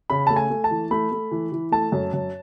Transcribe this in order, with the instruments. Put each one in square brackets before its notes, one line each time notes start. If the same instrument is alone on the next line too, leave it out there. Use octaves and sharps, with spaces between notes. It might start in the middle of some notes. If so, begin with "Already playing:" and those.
[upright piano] C#3 B5
A3 A5
G#5
A3
A5
E3
A3 B5
A3
E3
E3
A3 A5
F#2
F#2